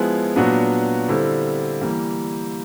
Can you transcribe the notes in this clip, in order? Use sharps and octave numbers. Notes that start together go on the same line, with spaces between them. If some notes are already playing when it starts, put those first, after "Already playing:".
Already playing: F3 G#3 B3 E4
A#2 F#3 B3 D4 F#4
D3 G3 C4 E4
E3 G3 A#3